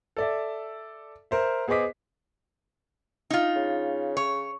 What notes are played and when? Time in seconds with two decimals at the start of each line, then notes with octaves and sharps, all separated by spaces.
0.17 A4 D5 E5
1.31 A#4 C5 E5
1.68 B3 G#4 C5 D#5 D6 B6
3.30 D#4 F4
3.56 C#3
4.17 C#5